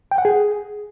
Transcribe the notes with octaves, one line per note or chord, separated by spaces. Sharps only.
G5
F#5
G#4